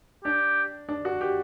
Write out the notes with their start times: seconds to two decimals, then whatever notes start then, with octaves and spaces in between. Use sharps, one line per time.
0.25 D4 G4
0.89 D4
1.05 F#4
1.21 G4